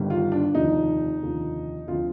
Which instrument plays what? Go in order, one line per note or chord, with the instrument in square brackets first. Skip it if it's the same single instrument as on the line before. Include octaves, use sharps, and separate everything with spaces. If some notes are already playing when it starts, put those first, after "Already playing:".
Already playing: [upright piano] G1 G2 D#3 G3
F4
D4
F1 D#2 D3 F3 D#4
F1 D#2 D3 F3
D2 C3 F3 F4